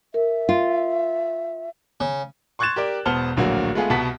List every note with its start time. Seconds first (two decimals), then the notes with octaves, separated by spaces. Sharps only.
0.14 A#4 E5
0.49 F4
2.00 C#3
2.59 C6 C#6 F#6 G#6 A6 E7
2.76 G4 A#4 D5
3.06 E1 B3 C5 A5 F6 G7
3.37 D1 A#1 D3 F#3 A#3 F#4
3.75 G#3 A3 B3 F4 G#4
3.90 C2 B2 B3 F#5 A5 B6